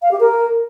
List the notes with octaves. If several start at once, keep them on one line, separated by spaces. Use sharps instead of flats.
F5
G4
A#4